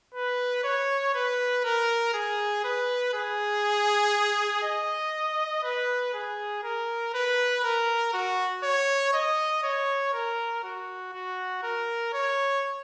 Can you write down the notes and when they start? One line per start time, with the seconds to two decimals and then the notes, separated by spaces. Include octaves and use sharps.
0.14 B4
0.64 C#5
1.14 B4
1.64 A#4
2.14 G#4
2.64 B4
3.14 G#4
4.63 D#5
5.64 B4
6.14 G#4
6.63 A#4
7.14 B4
7.64 A#4
8.13 F#4
8.63 C#5
9.14 D#5
9.63 C#5
10.13 A#4
10.63 F#4
11.14 F#4
11.63 A#4
12.13 C#5